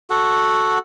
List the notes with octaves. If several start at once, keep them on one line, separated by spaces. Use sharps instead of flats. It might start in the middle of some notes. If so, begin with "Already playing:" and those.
F#4 A4 F#5